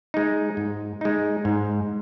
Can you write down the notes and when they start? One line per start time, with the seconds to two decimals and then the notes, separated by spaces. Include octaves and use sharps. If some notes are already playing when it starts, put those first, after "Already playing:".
0.14 G#3 D#4
0.57 G#2
1.01 G#3 D#4
1.45 G#2